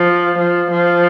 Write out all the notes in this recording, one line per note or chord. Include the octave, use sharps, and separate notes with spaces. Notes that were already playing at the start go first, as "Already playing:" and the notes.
Already playing: F3
F3
F3